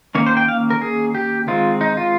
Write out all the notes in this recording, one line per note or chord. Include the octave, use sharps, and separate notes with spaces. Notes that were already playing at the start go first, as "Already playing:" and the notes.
D#3 A#3 C#4 C#5
C5
G5
F5
A#4
G#4
G4
D#3 G#3 C4 F4
D#4
F4